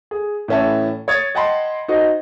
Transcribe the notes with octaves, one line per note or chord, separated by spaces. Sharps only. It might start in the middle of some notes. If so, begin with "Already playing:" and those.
G#4
A2 E3 C#4 E5 A5
C#5 D#6 G#6 A6
D#5 F#5 G5 A5 B5 C6
D#4 F#4 C5 D#5